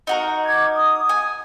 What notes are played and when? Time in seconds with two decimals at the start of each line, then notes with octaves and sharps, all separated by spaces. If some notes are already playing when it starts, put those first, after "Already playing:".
0.07 D#4 F#4 A#4
0.44 D6 G#6
0.75 D#6
1.09 G#5